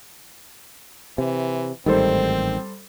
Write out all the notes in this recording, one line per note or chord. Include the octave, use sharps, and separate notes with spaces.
C3 E3
A1 G#2 D#3 G3 C4 A4 C5